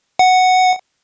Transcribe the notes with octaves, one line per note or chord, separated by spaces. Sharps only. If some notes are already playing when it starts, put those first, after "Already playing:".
F#5